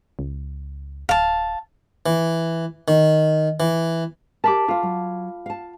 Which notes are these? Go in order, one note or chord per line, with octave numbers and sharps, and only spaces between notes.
C#2
D1 F5 A5
E3
D#3
E3
G4 A#4 A5 B5 D6
F4 A4 F5
F#3
F5 A5